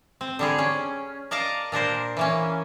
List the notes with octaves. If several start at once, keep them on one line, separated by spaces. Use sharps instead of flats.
C4
D3 G3 G#4
C#4
A#4 D5 D#5 F5 A5 A#5
A#2 D4 A#4 C5
E3 A#3 C#4